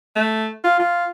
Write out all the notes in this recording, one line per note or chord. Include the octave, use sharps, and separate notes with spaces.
A3
F4
F4